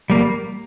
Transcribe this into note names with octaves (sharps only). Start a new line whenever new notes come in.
G3 A#3